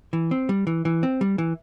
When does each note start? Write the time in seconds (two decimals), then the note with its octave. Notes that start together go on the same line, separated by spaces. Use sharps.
0.13 E3
0.31 C4
0.49 G3
0.67 E3
0.85 E3
1.03 C4
1.21 G3
1.38 E3